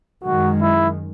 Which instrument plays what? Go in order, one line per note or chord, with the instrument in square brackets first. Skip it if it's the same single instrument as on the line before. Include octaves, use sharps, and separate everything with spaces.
[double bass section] F#2 D#3 G#3 [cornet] F#4
[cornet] E4